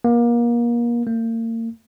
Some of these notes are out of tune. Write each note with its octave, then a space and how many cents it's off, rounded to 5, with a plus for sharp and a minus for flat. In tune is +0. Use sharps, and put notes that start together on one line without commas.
A#3 +30
A#3 -40